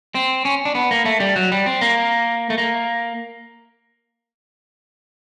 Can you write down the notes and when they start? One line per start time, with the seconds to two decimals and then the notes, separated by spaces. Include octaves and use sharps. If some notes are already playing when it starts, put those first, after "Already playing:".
0.15 C4
0.45 C#4
0.65 D4
0.75 B3
0.91 A#3
1.05 A3
1.20 G3
1.36 F#3
1.52 G3
1.66 C4
1.81 A#3
2.50 A3
2.58 A#3